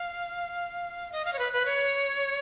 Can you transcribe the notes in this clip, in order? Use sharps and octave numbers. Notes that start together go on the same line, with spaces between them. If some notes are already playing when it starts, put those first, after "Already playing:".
Already playing: F5
D#5
F5
C#5
B4
B4
C#5